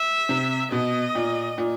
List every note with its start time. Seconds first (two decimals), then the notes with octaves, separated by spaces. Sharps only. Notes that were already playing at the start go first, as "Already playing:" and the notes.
Already playing: E5
0.29 C3
0.72 B2 D#5
1.15 A#2
1.58 A#2